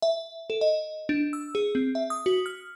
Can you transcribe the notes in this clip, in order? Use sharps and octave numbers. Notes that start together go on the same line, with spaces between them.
E5
A4
D#5
D4
E6
G#4
C4
E5
D#6
F#4
F6